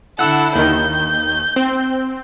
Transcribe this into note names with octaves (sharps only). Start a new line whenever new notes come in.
D3 E4 A4 F#5 E6
D#2 D#3 G6
C4